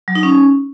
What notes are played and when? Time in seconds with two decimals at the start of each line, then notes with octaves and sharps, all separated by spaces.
0.08 F#3
0.15 D#4
0.23 C#4